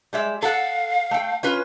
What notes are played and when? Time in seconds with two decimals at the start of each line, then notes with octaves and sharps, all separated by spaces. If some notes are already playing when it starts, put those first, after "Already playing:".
0.13 G3 G#3 E5
0.42 A4 F5 F#5
1.11 A3 G5
1.43 C#4 F4 B4